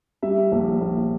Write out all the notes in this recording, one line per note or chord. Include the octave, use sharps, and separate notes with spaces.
G3 E5
A#1
A#1